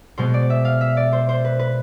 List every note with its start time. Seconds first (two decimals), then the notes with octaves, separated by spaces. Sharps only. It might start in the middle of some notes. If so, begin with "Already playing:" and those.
0.18 B2 G#3 B3 C5
0.34 D5
0.50 E5
0.65 F5
0.81 E5
0.97 D5
1.13 C5
1.29 C5
1.45 B4
1.59 B4